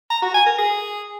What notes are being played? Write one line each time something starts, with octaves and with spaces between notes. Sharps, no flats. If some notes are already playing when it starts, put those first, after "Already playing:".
A#5
F#4
G#5
A#4
G#4